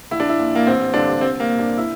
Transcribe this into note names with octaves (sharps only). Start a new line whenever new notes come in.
A#1 E4
D4
E4
A#2
A#3
A1 C4
G2 D3 D4
C2 C4
A#3
A#2
D4
E4